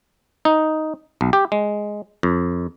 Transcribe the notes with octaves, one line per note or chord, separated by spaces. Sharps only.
D#4
B1
G4
G#3
F2